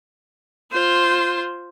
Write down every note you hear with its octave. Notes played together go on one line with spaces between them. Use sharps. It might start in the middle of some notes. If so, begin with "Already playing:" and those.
F4 C5